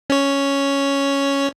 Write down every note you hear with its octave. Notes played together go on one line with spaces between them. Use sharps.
C#4 C#5